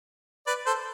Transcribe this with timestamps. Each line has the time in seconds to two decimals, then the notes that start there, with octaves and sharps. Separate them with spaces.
0.47 B4 D5
0.66 A4 C5